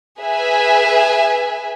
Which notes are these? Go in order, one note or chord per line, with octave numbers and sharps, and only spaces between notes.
G#4 B4 E5 G#5